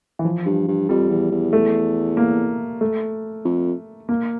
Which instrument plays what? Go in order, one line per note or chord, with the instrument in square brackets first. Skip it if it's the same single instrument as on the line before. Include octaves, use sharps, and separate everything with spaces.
[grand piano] E3
F3
[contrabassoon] G2
G2
[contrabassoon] F2 [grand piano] G3
[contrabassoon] E2
E2
[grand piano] A3
A#3
A3
[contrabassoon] F2
[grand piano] A#3